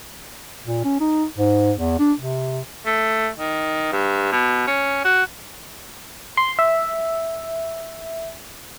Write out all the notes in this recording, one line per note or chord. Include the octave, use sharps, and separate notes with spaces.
A#2
C#4
D#4
G#2
E2
D4
C3
A3
D#3
G2
B2
C#4
F#4
C6
E5